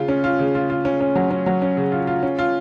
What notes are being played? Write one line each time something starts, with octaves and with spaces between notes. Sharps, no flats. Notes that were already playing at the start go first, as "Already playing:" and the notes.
Already playing: C#3 F4
C#4
F4
C#3
F4
F4
C#4
C#4
F#3
C#4
F#3
C#4
C#3
F4
F4
C#4
F4